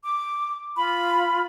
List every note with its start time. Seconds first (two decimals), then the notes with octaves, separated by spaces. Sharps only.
0.04 D6
0.77 F4 B5